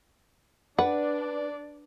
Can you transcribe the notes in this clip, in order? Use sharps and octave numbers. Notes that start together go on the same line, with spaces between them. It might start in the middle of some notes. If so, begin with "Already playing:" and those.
D4 B4 D5 F#5